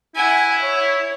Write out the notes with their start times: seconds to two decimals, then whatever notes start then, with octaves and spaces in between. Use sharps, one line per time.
0.16 E4 F#5 G#5
0.62 C#5